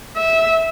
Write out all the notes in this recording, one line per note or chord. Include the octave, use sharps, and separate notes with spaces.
E5